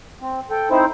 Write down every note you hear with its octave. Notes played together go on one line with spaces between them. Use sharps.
C4
A4 G5
C4 D#4 E4 C5